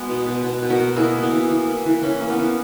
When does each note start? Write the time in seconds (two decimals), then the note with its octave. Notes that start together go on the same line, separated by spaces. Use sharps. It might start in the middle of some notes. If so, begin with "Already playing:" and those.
Already playing: G#3 B3 F#4
0.09 B2
0.26 B2
0.44 B2
0.62 B2
0.70 F#4 A#4
0.80 B2
0.96 A#3 E4 G#4
1.15 A#3
1.23 B3
1.32 E3
1.49 E3
1.67 A#3
1.86 E3
2.03 E3 C#4
2.21 A#3
2.30 B3
2.39 E3